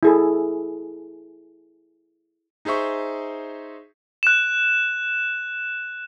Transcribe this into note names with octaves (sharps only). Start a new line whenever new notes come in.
E4 G#4 A4
D#4 G#4 C5 E5 C#6
F#6 E7